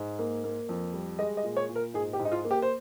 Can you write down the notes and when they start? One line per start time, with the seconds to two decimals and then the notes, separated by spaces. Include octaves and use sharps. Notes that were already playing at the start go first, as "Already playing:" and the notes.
Already playing: G#2
0.19 A#3
0.44 A#3
0.69 F2
0.93 G3
1.19 G#3 D#5
1.37 D#5
1.44 A#2
1.57 C#5
1.69 A#2
1.75 A#4
1.94 G#2 G#4
2.13 G4
2.19 G#2
2.25 D#4
2.32 F4
2.44 A#3
2.51 G4
2.62 C5